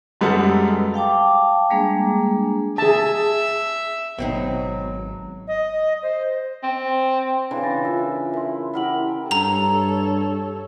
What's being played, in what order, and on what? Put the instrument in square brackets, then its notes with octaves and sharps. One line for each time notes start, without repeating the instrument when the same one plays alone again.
[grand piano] F#2 G3 G#3 B3 A4
[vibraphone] F5 G5 A5 D6
G3 G#3 A#3 D4 G#4
[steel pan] G#4 A5 [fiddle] E5
[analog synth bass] G#1 [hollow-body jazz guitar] B2 C4 D#4 [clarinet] F#3
[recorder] D#5
C5
[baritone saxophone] C4
[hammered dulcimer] C#3 E3 D4
[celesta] A6 A#6
[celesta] F4 A#4 [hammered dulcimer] E5
[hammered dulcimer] E4 [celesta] A#4 E5 C6
[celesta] E4 F#5 F#7 [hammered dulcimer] G4 A#4 B5
[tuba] G2 [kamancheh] A4 C#5 [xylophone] A#5 F7